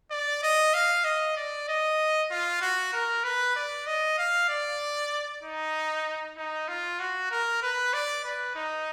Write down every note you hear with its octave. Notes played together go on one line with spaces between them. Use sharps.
D5
D#5
F5
D#5
D5
D#5
F4
F#4
A#4
B4
D5
D#5
F5
D5
D#4
D#4
F4
F#4
A#4
B4
D5
B4
D#4